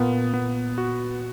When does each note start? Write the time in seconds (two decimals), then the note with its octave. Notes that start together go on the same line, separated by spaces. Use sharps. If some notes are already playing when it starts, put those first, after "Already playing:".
Already playing: A#2 B3
0.34 B3
0.78 F#4